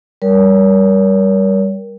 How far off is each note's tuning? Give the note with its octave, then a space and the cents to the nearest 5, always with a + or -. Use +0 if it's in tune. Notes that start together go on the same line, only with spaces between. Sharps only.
G3 +0 A#4 +20 C#5 +35